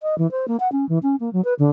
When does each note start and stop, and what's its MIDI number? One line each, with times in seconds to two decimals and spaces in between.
0.02 0.15 75
0.18 0.30 52
0.31 0.46 72
0.48 0.57 58
0.60 0.70 78
0.72 0.88 61
0.89 0.98 52
1.03 1.16 61
1.20 1.32 58
1.33 1.43 54
1.44 1.54 71
1.59 1.71 50